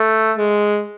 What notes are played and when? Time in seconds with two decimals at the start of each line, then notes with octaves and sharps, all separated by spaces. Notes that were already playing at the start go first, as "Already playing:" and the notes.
Already playing: A3
0.38 G#3